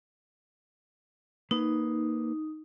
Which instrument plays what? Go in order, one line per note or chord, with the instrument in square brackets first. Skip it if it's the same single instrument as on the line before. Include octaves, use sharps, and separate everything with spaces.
[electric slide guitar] A#3 B4 [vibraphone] D#4